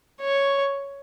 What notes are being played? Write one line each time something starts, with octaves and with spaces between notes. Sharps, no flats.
C#5